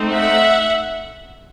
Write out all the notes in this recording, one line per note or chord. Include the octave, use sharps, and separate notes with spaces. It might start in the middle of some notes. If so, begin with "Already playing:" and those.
Already playing: A3 C4 D#4
E5 F#5